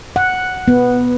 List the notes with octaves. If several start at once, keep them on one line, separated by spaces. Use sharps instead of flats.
F#5
B3